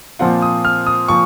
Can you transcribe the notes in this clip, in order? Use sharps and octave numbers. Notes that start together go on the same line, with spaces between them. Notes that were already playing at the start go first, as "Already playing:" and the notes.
A#2 F3 C4 F4 F#5
D#6
F6
D#6
A#2 F3 C#6